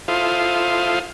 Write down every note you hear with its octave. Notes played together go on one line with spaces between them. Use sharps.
E4 F4 A4 C5 F5 D#6